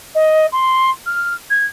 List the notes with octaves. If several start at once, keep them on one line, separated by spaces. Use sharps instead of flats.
D#5
C6
F6
G#6